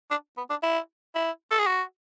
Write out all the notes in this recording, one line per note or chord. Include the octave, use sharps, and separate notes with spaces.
D4
B3
D4
E4
E4
A4
G#4
F#4